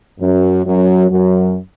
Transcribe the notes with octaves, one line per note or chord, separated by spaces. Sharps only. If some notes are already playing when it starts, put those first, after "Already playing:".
F#2 F#3
F#2 F#3
F#2 F#3